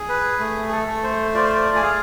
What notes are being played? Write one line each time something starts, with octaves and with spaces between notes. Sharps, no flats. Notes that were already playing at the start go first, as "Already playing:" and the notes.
Already playing: G#4
B4
A3
G#4
A4
A3
C5
F4 D5
C5
D5
G#5
G#4 F5